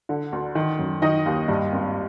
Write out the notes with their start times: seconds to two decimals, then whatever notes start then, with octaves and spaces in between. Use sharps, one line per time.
0.09 D3
0.33 D2
0.55 D#3
0.79 F#2
1.02 D#3 D#4 D#5
1.26 D#2
1.48 G2
1.72 G#1